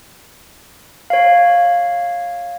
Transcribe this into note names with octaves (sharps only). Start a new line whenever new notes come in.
C#5 F5